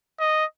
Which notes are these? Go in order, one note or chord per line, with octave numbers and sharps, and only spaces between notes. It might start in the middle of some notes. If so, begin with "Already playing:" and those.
D#5